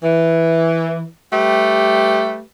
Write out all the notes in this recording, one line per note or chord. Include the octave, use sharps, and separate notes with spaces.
E3
G3 A3 G4 B4